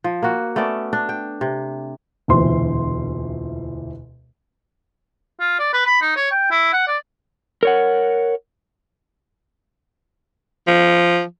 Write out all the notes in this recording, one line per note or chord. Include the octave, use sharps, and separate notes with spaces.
F3
A#3 F#4
A3 B3 C#4 D5
D4
G5
C3
E1 D2 A#2 E3 C5 C6
F4
D5
B4
B5
D#4
C#5
G5
E4
F#5
D5
A#4 C#5 F#5
F3